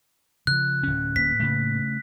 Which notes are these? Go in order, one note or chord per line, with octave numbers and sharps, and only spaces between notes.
C#3 F3 F#6
D1 C#4
A2 A#3 B3 B6
C#3 A3